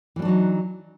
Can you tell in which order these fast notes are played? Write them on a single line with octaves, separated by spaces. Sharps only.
E3 G3 D4 F#3 D#4